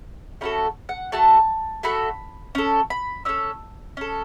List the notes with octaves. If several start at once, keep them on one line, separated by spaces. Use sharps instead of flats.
A3 C#4 F#4 A4 B5
F#5
A3 F#4 A4 A5
A3 F#4 A4 B5
C#4 A4
B5
C#4 A4 E6
C#4 A4